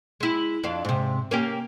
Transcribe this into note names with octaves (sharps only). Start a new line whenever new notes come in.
G#3 E4
F2 D4 F5
G#2 C3
A#3 C#4 G4